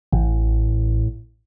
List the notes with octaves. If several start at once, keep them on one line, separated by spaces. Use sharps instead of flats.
A1 A2